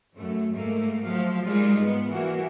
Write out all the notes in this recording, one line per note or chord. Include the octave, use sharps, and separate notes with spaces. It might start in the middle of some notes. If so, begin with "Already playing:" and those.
F#2 A3
G#2 A3 A#3
F3 F#3 A3 F5
G3 G#3 A#3 D#4 F4
G#2 B3
E3 G3 A#3 F#4